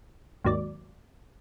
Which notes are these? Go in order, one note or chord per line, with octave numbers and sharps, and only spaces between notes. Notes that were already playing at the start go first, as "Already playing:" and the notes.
D#2 G#2 F#3 D5